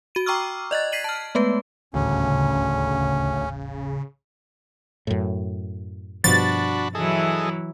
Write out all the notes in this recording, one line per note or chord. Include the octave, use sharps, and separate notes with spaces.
F#4 D#7
G5 A#5 C#6 D6 E6 F6
D5 D#5 F#6 A6
G#6 B6 C7 D#7 F#7
A5 F6
G#3 A3 B3 B4
D#1 A1 D2 C#3 C#4
F#2 A2
G2 B2 F3 D4 F#4 B5 A6
E3 F#3 E4 G#4 A4 D#5